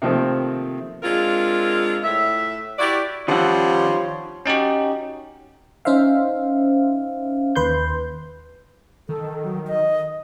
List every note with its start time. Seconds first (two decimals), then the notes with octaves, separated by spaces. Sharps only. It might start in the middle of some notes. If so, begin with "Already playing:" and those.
0.02 C3 D#3 F3 A3 A#3 C4
1.03 G#3 C4 D4 F4 A#4
2.04 A2 E5
2.78 E4 F#4 G4 D5
3.28 D#3 F3 G3 G4 C#5 F#5 C6
4.46 C#4 D#4 F#4 G4
5.85 C#4 D#4 C5 E5 F5
7.55 D#2 B4 C6 G6
9.09 D#3 A4
9.44 F#3
9.67 D#5